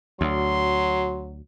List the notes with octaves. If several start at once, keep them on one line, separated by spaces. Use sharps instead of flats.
D2 F#3 C6